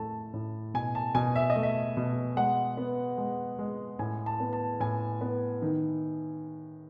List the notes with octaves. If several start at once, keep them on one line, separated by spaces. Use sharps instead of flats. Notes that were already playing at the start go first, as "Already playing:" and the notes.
Already playing: A2 A3 A5
A2
B2 G#5
A5
B2 G#5
E5
D#5
A3
E5
B2
G#3 F#5
B3
G#3
G#3
A2 G#5
A5
B3
A5
A2 G#5
B3
D#3